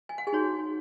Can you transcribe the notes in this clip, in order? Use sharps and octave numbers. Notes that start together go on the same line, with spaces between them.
G#5
F#5
G#4 G#5
D#4 F#4 C#5